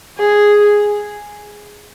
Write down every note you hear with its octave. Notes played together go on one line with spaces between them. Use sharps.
G#4